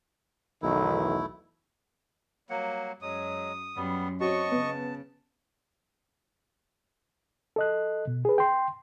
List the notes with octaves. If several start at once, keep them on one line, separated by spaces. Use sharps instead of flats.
B1 E2 D#3 A3 E4
F#3 G3 A#3 F#5
F#2 F#3 G#3 D#6
F#2 G3 B3
C4 F#4 C#5 D#5 A5 C#6
C#3 B3
A4 D#5 F#6
B2
G#4 B4
G5 C6